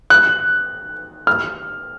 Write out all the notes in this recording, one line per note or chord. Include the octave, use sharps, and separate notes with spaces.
F#6
F6